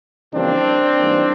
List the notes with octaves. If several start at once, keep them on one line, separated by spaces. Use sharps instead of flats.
F2 C#3 E3 G3 A#3 C4 D4
G#2 E3 G3 A#3